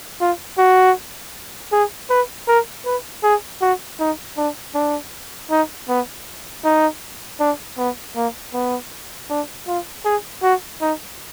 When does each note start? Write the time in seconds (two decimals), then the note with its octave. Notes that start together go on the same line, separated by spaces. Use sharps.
0.21 F4
0.58 F#4
1.72 G#4
2.10 B4
2.48 A#4
2.86 B4
3.23 G#4
3.61 F#4
4.00 D#4
4.37 D4
4.75 D4
5.51 D#4
5.89 B3
6.64 D#4
7.40 D4
7.78 B3
8.16 A#3
8.54 B3
9.30 D4
9.67 F4
10.05 G#4
10.43 F#4
10.81 D#4